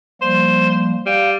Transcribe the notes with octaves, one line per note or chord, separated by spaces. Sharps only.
F3 G3 A#3 C5
G3 F5